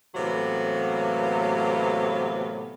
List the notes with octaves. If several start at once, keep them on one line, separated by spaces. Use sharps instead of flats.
A2 C3 E3 F#3 A#3 B3